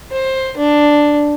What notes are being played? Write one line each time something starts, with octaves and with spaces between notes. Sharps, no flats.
C5
D4